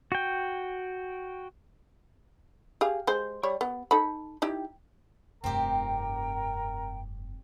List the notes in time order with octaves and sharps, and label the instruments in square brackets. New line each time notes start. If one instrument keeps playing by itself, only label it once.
[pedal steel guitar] F#4 G5
[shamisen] G4 G#4 F5
G#3 C5
G3 C#5 D5
B3
D#4 A4 B5
D#4 E4 G4
[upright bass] F1 G2 [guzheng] C4 G4 [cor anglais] A#4 [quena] G5